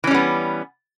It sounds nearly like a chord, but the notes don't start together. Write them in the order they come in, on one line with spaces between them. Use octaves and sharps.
E3 C#4 G3 B3